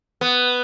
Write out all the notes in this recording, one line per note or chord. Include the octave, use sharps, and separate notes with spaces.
B3